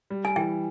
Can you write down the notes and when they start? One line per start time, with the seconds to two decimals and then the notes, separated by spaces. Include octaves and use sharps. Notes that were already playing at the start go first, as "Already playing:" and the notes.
0.10 G3
0.25 G#5
0.36 E3 G5